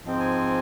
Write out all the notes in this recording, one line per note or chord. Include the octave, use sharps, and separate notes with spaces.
G#2 F3 G#3 C4
G#5